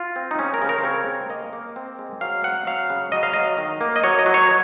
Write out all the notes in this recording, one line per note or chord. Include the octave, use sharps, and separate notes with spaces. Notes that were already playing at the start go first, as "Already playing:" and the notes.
Already playing: F4
C4
D#4
C#3 C#4
A#4
C#3
A#4
C5
C4 C#5
C#3
A#3 D#5
A#3
C4
G#3
F#3 F5
C4 F#5
F#3 F5
C#3
F#3 D#5
F5
F#3 D#5
D#3
A#3
D#5
F#3 C#5
D#5
F#3
C#5